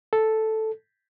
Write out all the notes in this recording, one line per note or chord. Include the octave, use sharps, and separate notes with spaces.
A4